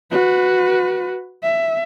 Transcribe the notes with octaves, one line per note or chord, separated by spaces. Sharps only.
F#4 B4
E5